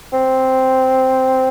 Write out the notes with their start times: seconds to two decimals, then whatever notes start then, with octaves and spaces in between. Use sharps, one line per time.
0.13 C4